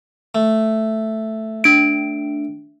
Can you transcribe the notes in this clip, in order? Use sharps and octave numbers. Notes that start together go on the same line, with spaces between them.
A3
D4 D7